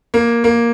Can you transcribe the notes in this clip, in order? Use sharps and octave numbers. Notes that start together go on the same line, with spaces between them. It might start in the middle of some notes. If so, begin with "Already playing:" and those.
A#3
A#3